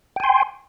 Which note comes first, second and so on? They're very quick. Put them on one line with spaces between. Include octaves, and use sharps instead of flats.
G5 G#5 C6